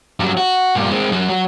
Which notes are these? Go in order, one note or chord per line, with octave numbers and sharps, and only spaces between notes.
G2 F#3
F#4
G2 A#2
G#3 C4
F#2 F#3
F#3